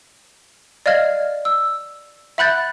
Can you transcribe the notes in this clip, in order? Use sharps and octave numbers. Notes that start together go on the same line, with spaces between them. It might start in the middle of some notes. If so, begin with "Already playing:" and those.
D5 D#5 F5 F6 G#6
E6
E5 F#5 B5 F#6 G6 A6